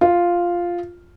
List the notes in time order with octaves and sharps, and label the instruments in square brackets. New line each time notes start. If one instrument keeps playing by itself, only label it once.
[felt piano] F4